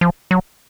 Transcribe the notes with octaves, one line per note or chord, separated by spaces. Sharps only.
F3
F#3